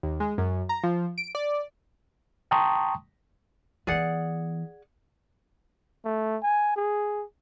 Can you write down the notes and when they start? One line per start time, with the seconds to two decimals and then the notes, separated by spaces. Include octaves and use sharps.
0.03 D#2
0.20 G#3
0.38 F#2
0.69 A#5
0.83 F3
1.18 D7
1.35 D5
2.51 G5 A5 A#5 C6 C#6 D#6
3.87 E3 B3 G#4 D5 F#5
6.05 A3
6.42 G#5
6.76 G#4